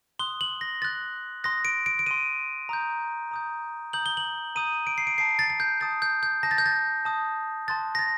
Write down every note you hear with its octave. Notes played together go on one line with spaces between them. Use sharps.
C6 D#6 F#6 G7
F#7
A#6
C6 D#6 F#6 A6
C6 D#6 F#6 A#6
D7
D7
D7
C6 D#6 F#6 D#7
A#5 D#6 G6
A#5 D#6 G6
A#5 D#6 G6 F#7
G7
F#7
A#5 D#6 G6 D#7
D7
C7
D7
A5 D#6 G6 C7
A6
A6
G6
A5 D#6 G6 A6
G6
G6
A5 D#6 G6 A#6
A6
G6
A6
A5 D#6 G6
A5 C6 D#6 F#6 A6
A#6
A6